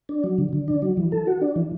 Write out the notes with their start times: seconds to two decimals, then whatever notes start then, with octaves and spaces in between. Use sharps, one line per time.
0.09 D4
0.24 F#3
0.38 D3
0.53 D3
0.68 D4
0.82 F#3
0.97 E3
1.12 A4
1.27 F#4
1.41 D4
1.56 E3